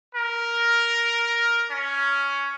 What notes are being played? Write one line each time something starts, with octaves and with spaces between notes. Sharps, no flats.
A#4
C#4